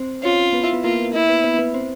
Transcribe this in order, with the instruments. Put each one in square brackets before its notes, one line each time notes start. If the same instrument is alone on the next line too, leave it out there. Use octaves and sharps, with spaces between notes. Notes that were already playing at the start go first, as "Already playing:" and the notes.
Already playing: [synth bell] C4 C5
[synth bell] C#4 C#5 [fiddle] F4
[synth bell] B3 B4
E4 E5
B3 B4
[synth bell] A#3 A#4 [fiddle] F4
[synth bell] A#3 A#4 [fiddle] E4
[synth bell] B3 B4
B3 B4
B3 B4
C4 C5